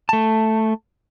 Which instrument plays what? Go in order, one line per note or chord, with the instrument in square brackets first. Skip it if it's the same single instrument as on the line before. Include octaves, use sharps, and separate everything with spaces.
[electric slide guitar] A3 A5